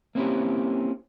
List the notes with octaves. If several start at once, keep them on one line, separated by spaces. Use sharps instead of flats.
A#3 C4 C#4 E4 G4